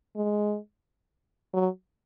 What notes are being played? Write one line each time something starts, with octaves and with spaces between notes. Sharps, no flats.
G#3
F#3